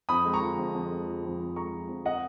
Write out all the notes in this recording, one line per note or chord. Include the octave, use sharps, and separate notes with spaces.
F2 B5 D#6
G#3
A#5 C#6
F3
F2
F2
G#3
F3
F2
F2
G#3 A#5 C#6
F3
F2
D#5 F#5